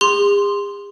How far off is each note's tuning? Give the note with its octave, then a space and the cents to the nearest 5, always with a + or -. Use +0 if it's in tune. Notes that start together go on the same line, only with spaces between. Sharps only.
G#4 -45 C6 +0